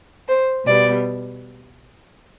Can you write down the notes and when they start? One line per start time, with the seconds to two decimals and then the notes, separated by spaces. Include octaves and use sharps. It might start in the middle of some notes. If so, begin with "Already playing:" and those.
0.29 C5
0.66 B2 G3 B3 D5